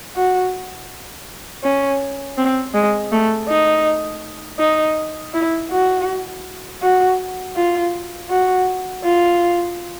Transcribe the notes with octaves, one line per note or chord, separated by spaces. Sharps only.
F#4
C#4
C4
G#3
A3
D#4
D#4
E4
F#4
F#4
F4
F#4
F4